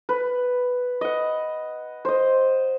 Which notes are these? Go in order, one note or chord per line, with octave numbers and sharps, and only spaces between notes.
B4
D#5 F#5
C5 D#5